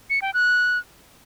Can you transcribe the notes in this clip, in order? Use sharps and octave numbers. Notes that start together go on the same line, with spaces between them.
C#7
G5
F#6